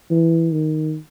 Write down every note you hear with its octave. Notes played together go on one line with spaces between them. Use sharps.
E3
D#3